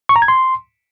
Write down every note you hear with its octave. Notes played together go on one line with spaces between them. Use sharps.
C#6
A#5
G#6
C6